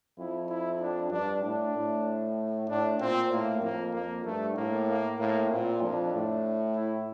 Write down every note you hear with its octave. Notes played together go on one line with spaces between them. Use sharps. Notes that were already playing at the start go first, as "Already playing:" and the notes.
F2 E4
E4
D4
G2 D4
A2 D4
A2
A2 D4
A#2 C4
A2 A#3
F2 A#3
F2 A#3
G2 A3
A2 A#3
A#3
A2 A#3
A#2 C4
F2 D4
A2
E4